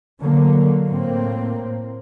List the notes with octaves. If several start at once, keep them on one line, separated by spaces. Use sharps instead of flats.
D3 F#3 A#3
A2 A#3 C4